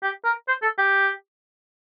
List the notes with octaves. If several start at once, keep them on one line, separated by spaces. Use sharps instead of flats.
G4
A#4
C5
A4
G4